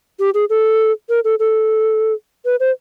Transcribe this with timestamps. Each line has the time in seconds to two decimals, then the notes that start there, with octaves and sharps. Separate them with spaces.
0.19 G4
0.34 G#4
0.50 A4
1.09 A#4
1.24 A4
1.39 A4
2.45 B4
2.60 C5